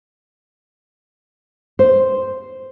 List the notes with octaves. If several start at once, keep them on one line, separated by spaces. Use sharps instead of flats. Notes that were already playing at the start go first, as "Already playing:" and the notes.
C5